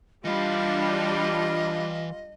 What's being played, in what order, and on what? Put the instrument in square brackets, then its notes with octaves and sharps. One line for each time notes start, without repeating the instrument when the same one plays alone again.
[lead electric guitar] E3 F5 [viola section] G3 D4 [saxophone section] F4 [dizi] D#5